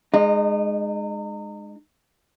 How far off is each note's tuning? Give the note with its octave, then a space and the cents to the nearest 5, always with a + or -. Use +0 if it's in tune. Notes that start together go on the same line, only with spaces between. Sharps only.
G#3 +0 D#4 -35